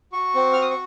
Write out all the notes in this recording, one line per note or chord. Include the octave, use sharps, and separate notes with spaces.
F#4 C#6
C4
F#4 F6
D#6
C#6